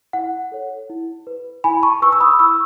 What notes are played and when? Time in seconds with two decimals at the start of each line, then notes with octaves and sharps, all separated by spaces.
0.13 E4 F#5
0.52 A4 C#5
0.90 E4
1.27 B4
1.64 E4 G#5 B5
1.83 A5 C#6
2.02 B4 C#6 E6
2.12 E6
2.20 B5 D#6
2.39 E4 C#6 E6